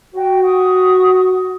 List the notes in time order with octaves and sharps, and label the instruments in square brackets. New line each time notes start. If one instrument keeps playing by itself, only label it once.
[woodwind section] F#4 [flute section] G5
[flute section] F#5 C#6 D#6